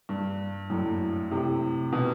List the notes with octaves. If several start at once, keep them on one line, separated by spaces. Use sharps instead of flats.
G2
F#2 A2
A2 C3
B2 D#3